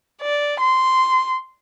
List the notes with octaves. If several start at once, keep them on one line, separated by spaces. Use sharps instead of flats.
D5
C6